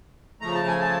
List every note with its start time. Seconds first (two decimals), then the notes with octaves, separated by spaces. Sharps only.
0.41 C#3 F3 A3 A#5
0.55 A5
0.67 G#5
0.80 A5